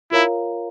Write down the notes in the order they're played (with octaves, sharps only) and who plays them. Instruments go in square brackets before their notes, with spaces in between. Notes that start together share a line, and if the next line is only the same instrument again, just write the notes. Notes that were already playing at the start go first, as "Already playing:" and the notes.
[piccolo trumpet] E4 [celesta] F4 A#4 C#5 F5 A#5